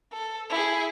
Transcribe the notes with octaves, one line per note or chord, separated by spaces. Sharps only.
A4
E4 G#4